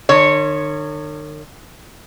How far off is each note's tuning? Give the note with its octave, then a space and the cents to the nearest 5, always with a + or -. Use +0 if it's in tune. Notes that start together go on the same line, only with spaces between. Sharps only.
D#3 -45 C#5 +0